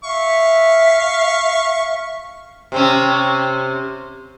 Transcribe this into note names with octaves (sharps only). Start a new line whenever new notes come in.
E5 F5 C#6
C3 C4 C#4